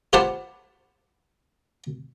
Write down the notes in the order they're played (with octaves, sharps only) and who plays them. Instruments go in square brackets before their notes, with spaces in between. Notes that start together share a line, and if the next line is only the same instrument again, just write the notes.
[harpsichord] F4 G4 B4 C5 F#5 A5